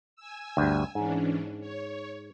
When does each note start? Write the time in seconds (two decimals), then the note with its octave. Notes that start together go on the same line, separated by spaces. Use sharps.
0.16 G#5 E6
0.57 D2 G2
0.95 G#2 E3 C#4 D4
1.60 C#5